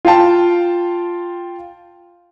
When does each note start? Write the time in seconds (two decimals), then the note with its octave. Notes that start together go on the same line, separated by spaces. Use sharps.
0.05 F4 F5 G5 A5